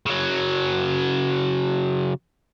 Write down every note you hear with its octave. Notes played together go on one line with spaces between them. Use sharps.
C#3 F#3